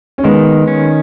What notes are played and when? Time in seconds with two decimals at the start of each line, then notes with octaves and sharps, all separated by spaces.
0.18 C#4
0.24 D#3 G#3 B3
0.68 C#4